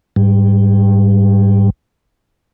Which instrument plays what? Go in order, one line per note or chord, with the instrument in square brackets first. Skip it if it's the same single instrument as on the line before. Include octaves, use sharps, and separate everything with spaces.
[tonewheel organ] G#2 G3